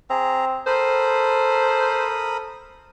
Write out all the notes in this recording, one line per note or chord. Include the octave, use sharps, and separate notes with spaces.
C4 G#4 A#5
A4 A#4 C5 B5 D#6